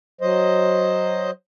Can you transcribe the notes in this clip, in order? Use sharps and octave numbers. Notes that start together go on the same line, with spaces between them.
F#3 C5 D#5